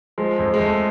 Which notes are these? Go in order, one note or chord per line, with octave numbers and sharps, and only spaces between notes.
F3 G#3
F2
G#3
F2 A3